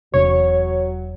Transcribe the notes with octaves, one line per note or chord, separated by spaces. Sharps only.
E1 C3 F#3 D4 C#5